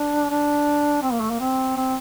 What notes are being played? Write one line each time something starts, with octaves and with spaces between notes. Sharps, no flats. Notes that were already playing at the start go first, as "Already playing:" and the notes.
Already playing: D4
D4
C4
A#3
A3
A#3
C4
C4